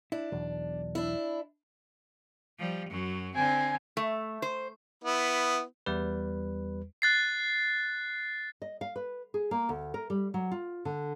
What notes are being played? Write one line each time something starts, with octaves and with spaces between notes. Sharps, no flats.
D4 E4
B1 E2
D4 E4
F3 G3
F#2 F#3
D3 C4 G#5
A3
C5
B3 E4
E2 G3 B4
F#6 A6 C7
D#5
F5
B4
G#4
A#3
D2
A#4
G3
F#3
F4
D3